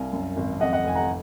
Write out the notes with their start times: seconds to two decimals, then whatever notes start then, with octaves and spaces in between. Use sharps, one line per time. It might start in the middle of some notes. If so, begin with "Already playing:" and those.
Already playing: C2 F5 G#5
0.13 F#2
0.37 G#1
0.60 F2 D#5 F#5
0.73 D#5 F#5
0.84 F1 G#5
0.95 F#5 A#5